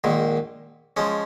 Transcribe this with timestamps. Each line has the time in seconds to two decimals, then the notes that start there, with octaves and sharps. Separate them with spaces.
0.04 A#1 G#2 D#3
0.97 F3 G#3 C#4